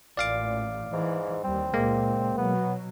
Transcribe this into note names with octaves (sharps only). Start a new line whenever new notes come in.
A1 A#2 D5 F5 D6
G#2 E3
D#2 G3 C4
C#2 A#2 G#3 A#3
B2 F#3 B3